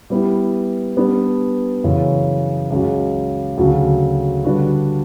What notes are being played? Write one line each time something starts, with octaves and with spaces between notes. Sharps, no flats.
G3 B3 E4 G4
G3 B3 D4 G4
F#2 C#3 E3
C#2 C#3 F#3
D2 C#3 F#3
D3 G3 D4 F#4 B4